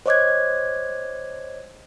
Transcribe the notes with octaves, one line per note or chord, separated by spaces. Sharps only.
C5 C#5 D#5 D6 F#6 G#6